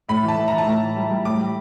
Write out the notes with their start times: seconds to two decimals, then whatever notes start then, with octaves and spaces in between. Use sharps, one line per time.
0.08 A2 B5
0.23 E3
0.28 A5
0.38 A2
0.48 E3 A#5
0.58 A5
0.66 A2 A#5
0.82 E3
0.96 G3
1.10 G3
1.25 A2 D6
1.40 G3